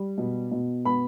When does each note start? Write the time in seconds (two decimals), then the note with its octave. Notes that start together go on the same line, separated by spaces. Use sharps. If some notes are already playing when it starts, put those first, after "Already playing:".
Already playing: G3
0.18 B2
0.51 B2
0.85 B3 B5